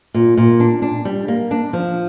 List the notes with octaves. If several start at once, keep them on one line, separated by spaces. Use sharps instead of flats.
A#2
A#2
D4
D4
G3
A#3
D4
F3